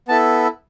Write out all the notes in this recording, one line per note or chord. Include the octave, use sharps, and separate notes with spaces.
B3 E4 A4 A5